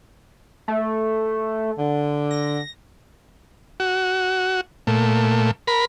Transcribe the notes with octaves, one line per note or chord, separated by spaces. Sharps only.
A3
D3
A#6
F#4
A#2 A3
A#4 B5